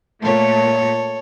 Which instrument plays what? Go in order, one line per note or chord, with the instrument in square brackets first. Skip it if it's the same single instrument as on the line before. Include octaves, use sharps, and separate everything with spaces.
[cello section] A#2 A3 [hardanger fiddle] A4 C#5